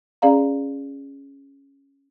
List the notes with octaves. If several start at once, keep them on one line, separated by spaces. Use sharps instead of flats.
C#4 G#4 D5 F5 A#5